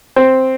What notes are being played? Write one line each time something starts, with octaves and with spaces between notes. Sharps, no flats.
C4